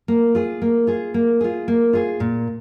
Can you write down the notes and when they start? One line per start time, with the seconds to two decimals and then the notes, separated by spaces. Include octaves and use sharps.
0.08 A#3
0.35 F4 G#4
0.62 A#3
0.87 F4 G#4
1.14 A#3
1.41 F4 G#4
1.68 A#3
1.93 F4 G#4
2.20 A#2